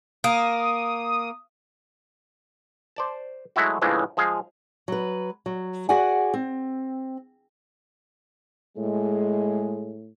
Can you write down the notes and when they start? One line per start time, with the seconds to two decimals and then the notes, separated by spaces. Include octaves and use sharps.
0.24 A#3 D#6
2.96 C5 D5 A5
3.56 F#3 G#3 A3 E4 F#4
3.82 A2 C#3 E3 F3 G#3 D4
4.17 F3 G#3 G#4 F5
4.88 F#3 B4
5.46 F#3
5.89 F#4 G#4 D5 F#5 G#5
6.34 C4
8.78 A2 G#3